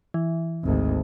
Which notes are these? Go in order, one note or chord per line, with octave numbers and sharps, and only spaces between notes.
E3
G#1 D2